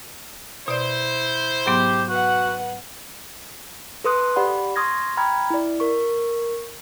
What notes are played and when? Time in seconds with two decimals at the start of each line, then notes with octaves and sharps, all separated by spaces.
0.68 B2 E4 C5 D5
1.66 G#2 F#3 B3 G4
2.08 F#4 B4 F#5
4.04 A4 B4 C6 D#6 F#6
4.36 G4 D5 F#5 B5
4.76 C6 C#6 D#6 F6 G#6 A#6
5.17 G5 A#5 B5 F6 G#6
5.50 E4 D5
5.80 A#4 C#6